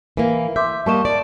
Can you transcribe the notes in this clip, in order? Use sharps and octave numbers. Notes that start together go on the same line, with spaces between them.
E3 A#3
E5 C6 D6 G6
G3 A#3 D#5 A5 C#6 E7
D5 D7